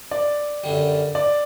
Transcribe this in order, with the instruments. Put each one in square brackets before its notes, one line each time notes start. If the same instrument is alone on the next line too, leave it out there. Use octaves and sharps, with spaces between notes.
[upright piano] D5
[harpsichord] F#2 D3 G3
[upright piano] D5